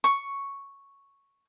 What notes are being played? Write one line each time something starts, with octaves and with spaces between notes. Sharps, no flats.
C#6